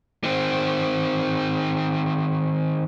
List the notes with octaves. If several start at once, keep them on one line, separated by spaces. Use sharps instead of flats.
D#3 C4